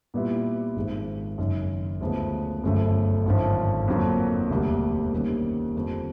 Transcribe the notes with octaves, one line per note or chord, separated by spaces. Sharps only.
A#2 G3 B3 E4
G#1 G#2 F3 G#3
F#1 F#2 D#3
D2 C#3 F3 G#3 B3
G1 F#2 C#3 F3 A3
G#1 F#2 D3 F3
F2 D3 F#3 A#3
E1 D2 D3 G3 A#3
D#3 G3 A#3 C#4
F2 D3 G3